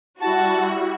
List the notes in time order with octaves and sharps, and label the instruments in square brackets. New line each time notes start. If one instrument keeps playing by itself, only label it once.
[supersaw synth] G3 E4 [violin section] F#4 [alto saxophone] A5